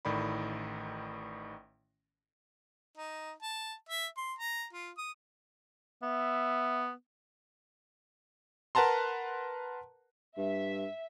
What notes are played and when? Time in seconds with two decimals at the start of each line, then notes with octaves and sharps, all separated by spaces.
0.05 A1 A2 D#3 D5 B5
2.97 D#4
3.42 A5
3.89 E5
4.17 C6
4.39 A#5
4.73 F4
4.97 D#6
6.03 B3 E5
8.75 A#4 B4 F#5 A5 A#5 C6
10.37 G2 E5